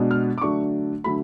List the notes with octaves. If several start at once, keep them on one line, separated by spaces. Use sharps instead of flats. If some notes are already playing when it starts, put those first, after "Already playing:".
Already playing: B2 G#3 B3 D4
F6
D6
D3 F#3 A3 D4 C#6
D3 F#3 A3 B5